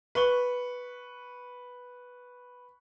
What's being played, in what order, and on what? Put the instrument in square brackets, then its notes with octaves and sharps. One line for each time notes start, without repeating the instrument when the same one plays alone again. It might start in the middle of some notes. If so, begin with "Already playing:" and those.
[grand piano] B4 C#6 G7